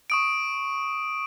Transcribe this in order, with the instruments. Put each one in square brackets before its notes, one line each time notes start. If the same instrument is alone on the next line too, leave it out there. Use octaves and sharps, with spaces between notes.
[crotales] C#6 D#6 D7